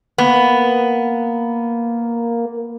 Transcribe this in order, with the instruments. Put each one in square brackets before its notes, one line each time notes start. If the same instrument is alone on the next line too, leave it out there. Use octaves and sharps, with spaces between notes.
[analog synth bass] A#3 [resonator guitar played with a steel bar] B3